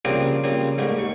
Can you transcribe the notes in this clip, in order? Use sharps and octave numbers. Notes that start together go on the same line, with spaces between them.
C#3 F3 G3 A#3 C4 D4
C#3 F3 G3 A#3 C4
G#2 G3 A3 A#3
D#2 C#6